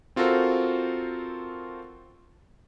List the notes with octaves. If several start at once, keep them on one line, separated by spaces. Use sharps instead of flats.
C4 F4 F#4 A4 A#4 C5